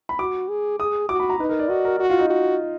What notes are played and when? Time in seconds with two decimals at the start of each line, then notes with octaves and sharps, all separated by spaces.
0.09 B5
0.19 F#4 D6
0.49 G#4
0.80 G#4 D#6
1.09 F#4 D6
1.20 B5
1.30 A#5
1.39 D#4 B4
1.49 A#4
1.59 D5
1.69 F#4 D#5
1.85 A#4
1.99 F#4
2.10 F4
2.19 D#4
2.30 F#4